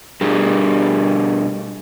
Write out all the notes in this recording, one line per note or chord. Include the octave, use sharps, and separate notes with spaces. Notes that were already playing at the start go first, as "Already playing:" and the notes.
B2 G3 D4 G4 G#4 A#4